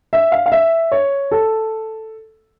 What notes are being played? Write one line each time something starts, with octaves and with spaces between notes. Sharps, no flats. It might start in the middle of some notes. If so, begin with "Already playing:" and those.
E5
F5
F5
E5
C#5
A4